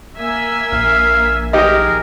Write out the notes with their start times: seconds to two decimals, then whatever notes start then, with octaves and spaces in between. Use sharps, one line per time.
0.18 A#3 E5 G#5
0.72 A#1 F5
1.53 D#4 G4 G#4 A#4